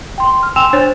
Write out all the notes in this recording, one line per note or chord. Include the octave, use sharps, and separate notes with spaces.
G5 C6
F6
G5 G#5 C6 E6 E7 F7
D4 C5 C#5 A6